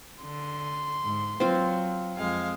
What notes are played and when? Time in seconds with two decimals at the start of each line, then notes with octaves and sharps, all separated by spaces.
0.23 D3 C6
1.04 G#2
1.40 F#3 C4 F4
2.18 F2 G#3 F5